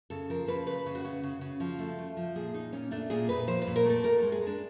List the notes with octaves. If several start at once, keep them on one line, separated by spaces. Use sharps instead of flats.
C#3 A4
F3 A#4
C#3 B4
C#3 B4
C#3
F#4
C#3
C#3
C#3
F3
A3
A3
F3
A#2 G#4
A#2 D#4
A#2 C#4
A3 D4
A#2 G#4
A#2 B4
F3 C5
B4
A#2
A#4
A3 A4
A2 A#4
G#3 A4
G#4
G#3
D4